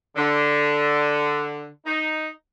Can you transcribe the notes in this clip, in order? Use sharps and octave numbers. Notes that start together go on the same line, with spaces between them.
D3
D#4